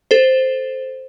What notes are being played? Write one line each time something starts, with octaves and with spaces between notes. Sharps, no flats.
A4 C5